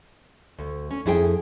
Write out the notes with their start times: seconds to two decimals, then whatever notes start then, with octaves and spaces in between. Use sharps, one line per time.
0.59 D2
0.91 C#4
1.06 F2 E4 G#4 G5